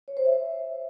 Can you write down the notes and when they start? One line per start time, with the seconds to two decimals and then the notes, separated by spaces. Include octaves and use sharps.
0.08 C#5
0.17 C5
0.26 E5